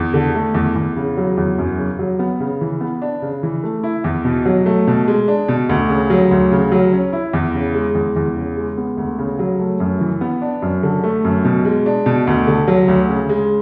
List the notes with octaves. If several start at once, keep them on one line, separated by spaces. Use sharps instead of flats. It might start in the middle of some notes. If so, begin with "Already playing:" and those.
Already playing: E2
D3
A3
E2
E2
C#3
F#3
E2
F#2
C#3
F#3
B3
C#3
E3
B3
D4
C#3
E3
A3
E4
E2
B2
F#3
A3
B2
G#3
D4
B2
D2
C#3
F#3
D2
C#3
F#3
C#4
E4
E2
C#3
G#3
E2
E2
C#3
G#3
B3
D2
C#3
F#3
A3
F#2
E3
B3
D4
F#2
D3
A3
F#2
B2
G#3
D4
B2
D2
D3
F#3
D2
C#3
G#3